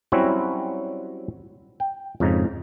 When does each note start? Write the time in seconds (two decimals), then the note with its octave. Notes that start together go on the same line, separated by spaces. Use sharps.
0.12 F#3 G3 C4 C#4 E4 F#4
1.80 G5
2.20 F2 G#2 C#3 D#4